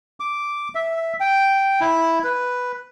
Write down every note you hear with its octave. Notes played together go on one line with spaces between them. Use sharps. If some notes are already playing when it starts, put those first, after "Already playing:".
D6
E5
G5
E4
B4